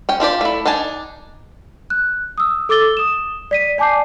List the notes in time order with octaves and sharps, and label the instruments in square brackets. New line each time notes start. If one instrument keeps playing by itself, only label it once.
[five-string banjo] C#4 G5
D4 F4 G4 D5
A3 E4
D4 D#4 G#5 A5
[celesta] F#6
D#6 E6
A4 D6 E6 A6 G7
D#6 E7
D5 B6 D#7
D5 G#5 A5 D6 G6 C7